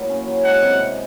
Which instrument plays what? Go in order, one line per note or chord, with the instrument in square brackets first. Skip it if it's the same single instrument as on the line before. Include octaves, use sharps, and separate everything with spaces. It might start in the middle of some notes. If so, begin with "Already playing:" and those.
Already playing: [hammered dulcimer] F#3 A#3 E4
C#4
F#3
[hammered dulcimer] G#3 [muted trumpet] F#5
[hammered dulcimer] C3
C3